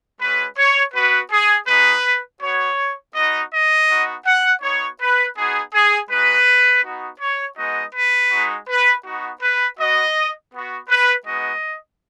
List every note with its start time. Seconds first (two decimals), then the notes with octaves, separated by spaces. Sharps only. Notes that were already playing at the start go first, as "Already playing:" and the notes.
0.20 G#3 C#4 F#4 B4
0.57 C#5
0.94 B3 F#4 B4
1.31 G#4
1.67 G#3 D#4 F#4 B4
2.41 B3 F#4 C#5
3.15 B3 D#4 F#4 D#5
3.53 D#5
3.90 B3 D#4 F#4
4.26 F#5
4.62 B3 D#4 F#4 C#5
5.00 B4
5.36 B3 D#4 F#4 G#4
5.73 G#4
6.10 G#3 D#4 F#4 B4
6.84 B3 D#4 F#4
7.20 C#5
7.57 G#3 B3 D#4 F#4 D#5
7.95 B4
8.31 G#3 D#4 F#4
8.68 B4
9.05 B3 D#4 F#4
9.42 B4
9.79 B3 F#4 D#5
10.53 B3 F#4
10.89 B4
11.26 G#3 B3 D#4 F#4 D#5